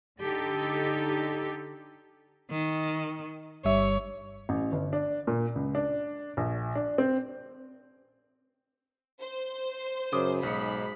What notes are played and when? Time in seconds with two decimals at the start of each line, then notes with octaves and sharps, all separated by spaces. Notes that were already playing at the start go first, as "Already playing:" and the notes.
0.20 D3 D#4 G4 A4
2.51 D#3
3.65 G1 G3 C#5 E5
4.49 A1
4.72 G1
4.93 D4
5.27 A#2
5.55 C#2
5.75 D4
6.37 A#1
6.75 D4
6.98 C4
9.21 C5
10.13 F#2 C#3 D6 D#6
10.43 B1 G#2 B5 C#7